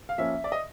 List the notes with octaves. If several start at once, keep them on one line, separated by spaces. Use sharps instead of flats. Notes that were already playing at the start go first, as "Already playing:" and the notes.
F5
F3 A#3 C#4 E5
D5
D#5